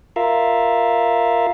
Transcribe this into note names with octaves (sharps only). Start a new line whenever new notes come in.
F4 A#4 E5 F5